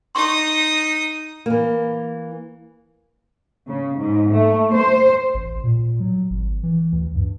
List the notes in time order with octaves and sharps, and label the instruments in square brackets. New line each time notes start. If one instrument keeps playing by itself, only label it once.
[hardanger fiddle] D#4 D#6 [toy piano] C6 C#6
[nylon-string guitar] E3 A#3
[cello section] C#3
G#2
A3
C5
[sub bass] A1
A#2
F#3
G#1
E3
D2
G2